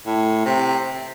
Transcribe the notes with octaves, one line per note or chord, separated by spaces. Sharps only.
A2
C3